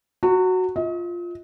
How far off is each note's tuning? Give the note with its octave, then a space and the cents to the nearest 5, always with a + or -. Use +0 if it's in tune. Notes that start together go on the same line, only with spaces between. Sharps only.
F#4 +0 A#5 -40
F4 +0 D#5 +40